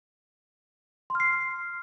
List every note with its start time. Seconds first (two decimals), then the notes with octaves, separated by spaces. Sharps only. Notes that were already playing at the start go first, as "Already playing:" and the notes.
1.10 C6
1.15 F6
1.20 C7